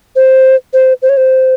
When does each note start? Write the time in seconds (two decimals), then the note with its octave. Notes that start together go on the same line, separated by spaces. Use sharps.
0.16 C5
0.73 C5
1.02 C5
1.09 C#5
1.17 C5